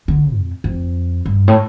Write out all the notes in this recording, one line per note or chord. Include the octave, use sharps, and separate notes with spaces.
D3
F2
F2
G2
A2